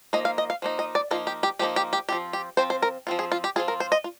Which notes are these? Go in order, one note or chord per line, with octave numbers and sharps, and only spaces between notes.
F3 A#3 D#4 D#5
F5
D#5
F5
F3 A#3 D#4
D#5
D5
F3 A#3 D#4 F4
G4
G4
F3 A#3 D#4 G4
G4
G4
F3 C4 F4 G4
G4
F3 C4 F4 C5
C5
A#4
F3 C4 F4
G#4
F4
G4
F3 C4 F4 G#4
A#4
C5
D#5
F4